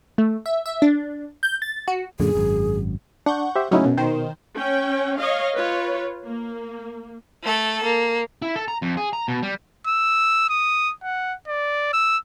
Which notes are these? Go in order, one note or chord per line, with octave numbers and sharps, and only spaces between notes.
A3
E5
E5
D4
G6
A6
F#4
F#2 A#2 D3 G#4
G#1 F#2
D4 F#5 C#6 G6
G4 C5 E5
A2 C#3 F#3 C#4 D#4 E4
F#2 B2
D#3 C5
C#4 G5
C#5 D#5 F5
F4 B4 C#5
A#3
A3 A4
A#3
E4
A4
A#5
F2
G#4
A#5
B2
G3
E6
D#6
F#5
D5
E6